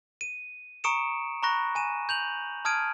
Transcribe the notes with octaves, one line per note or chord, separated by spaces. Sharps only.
D#7
A#5 C#6 D#6 C#7 D7 E7
A#5 B5 C#6 F#6 A#6
G#5 D#7 E7
G6 F7 F#7
A5 D#6 F6 G#6 D7 D#7